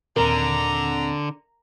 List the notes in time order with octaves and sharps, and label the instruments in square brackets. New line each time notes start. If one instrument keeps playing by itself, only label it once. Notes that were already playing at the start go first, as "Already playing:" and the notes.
[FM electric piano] D#2 A#2 C4 [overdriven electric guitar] D3 [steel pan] A#4 [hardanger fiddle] A#5